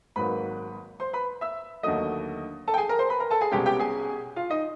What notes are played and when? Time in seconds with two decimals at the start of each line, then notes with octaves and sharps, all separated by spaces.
0.16 G#1 G#2 D#3 F#3 A#3 B4 B5
1.00 C5 C6
1.13 B4 B5
1.41 E5 E6
1.83 D#2 D3 F#3 A3 D#5 D#6
2.68 A4 A5
2.74 G5
2.78 G#4 G#5
2.89 A#4 A#5
2.99 C5 C6
3.09 B4 B5
3.20 A#4 A#5
3.31 A4 A5
3.41 G#4 G#5
3.51 C2 B2 G#3 C#4 G4 G5
3.66 G4 G5
3.79 G#4 G#5
4.36 F4 F5
4.50 D#4 D#5